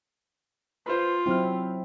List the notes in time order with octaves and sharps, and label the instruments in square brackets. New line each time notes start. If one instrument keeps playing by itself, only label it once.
[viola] F4 [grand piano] B4 C5
[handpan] F#3 C4 E4 [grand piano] G5 F6